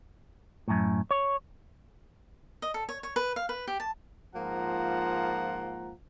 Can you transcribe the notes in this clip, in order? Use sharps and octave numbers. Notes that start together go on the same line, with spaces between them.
F#2 A2
C#5
D#5
A4
C#5
C#5
B4
F5
B4
G4
A5
G#2 F3 A#3 F4 F#5 A#5